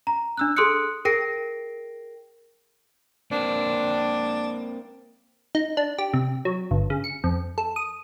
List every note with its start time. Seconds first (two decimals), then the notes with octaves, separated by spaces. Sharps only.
0.07 A#5
0.37 D4 E6 F#6
0.57 G#4 A4 C6 D#6 F#6 C#7
1.05 G#4 A#4 G5 A#6 C7 D7
3.32 A#3 C4 D4
5.55 D#4
5.77 D4
5.98 G4
6.13 C3
6.45 F#3
6.71 G1
6.90 C#3
7.04 C#7
7.24 F2
7.58 A4
7.76 D#6